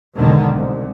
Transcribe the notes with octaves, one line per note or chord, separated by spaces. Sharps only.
B1 E2 G#2 B2 D3 D#3
C2